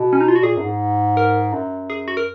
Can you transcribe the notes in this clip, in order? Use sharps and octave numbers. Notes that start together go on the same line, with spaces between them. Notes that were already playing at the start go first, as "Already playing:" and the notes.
Already playing: B2
C#4
D#4
F4
F#4
A#2 G#4
F#2
G#2
A#4
F#2
G#4
F#4
A#4